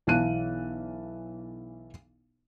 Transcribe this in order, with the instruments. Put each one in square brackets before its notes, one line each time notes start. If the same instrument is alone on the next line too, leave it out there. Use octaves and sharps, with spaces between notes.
[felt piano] B1 E3 F5 A5 F#6 D#7